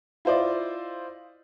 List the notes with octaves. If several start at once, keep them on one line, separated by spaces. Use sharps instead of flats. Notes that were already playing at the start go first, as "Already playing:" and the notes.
E4 F4 C5 D5 D#5